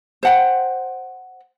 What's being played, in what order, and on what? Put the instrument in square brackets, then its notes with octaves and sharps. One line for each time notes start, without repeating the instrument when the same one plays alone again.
[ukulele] C5 F#5 G5